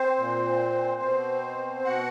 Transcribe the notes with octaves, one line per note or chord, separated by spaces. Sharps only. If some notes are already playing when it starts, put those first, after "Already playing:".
Already playing: C4 C5
A#2
B2
B2 F#4 F#5